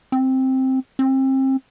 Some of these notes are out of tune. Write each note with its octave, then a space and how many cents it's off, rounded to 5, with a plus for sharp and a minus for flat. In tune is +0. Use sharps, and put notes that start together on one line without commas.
C4 +5
C4 +30